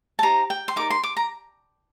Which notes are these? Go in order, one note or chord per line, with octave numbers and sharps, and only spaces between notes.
A5
D#4 G4 C5 A#5
G5
C6
D#4 A#4 D5 D6
C6
D6
A#5